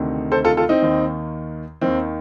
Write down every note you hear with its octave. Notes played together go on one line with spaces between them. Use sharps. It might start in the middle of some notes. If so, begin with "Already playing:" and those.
Already playing: D2 C3 D#3
A4 C5
F4 A4
F4 A4
C4 D#4
D#2 D#3
D#2 D#3 C4